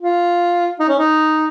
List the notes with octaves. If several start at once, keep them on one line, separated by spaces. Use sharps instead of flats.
F4
D#4
C#4
D#4